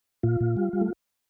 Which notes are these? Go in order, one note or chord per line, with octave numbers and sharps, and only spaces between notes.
A#2 F4
A#2
G3
G3
A3